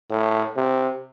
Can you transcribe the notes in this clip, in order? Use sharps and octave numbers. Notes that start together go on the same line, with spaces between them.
A2
C3